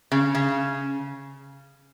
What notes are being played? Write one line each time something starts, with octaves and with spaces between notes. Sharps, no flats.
C#3
C#3